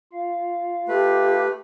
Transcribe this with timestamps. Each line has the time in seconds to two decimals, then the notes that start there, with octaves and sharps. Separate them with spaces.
0.13 F4 F5
0.88 A3 G4 B4